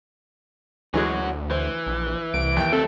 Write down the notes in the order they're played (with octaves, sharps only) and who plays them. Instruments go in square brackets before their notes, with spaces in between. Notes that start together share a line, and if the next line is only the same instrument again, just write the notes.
[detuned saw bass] D2 [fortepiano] E3 F#3 G#3 [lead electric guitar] C#4 F#4
[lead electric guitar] E3 [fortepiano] C5
[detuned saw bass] A#1
[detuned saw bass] C2 [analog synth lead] D7
[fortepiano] D#2 G5
[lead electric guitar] F#3 A3 [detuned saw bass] C4 [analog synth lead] A4